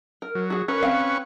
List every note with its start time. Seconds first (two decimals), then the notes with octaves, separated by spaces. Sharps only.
0.22 A#4
0.35 F#3
0.50 F#4 G#4
0.68 C#4 A#4 B4 C#6
0.83 C4 F5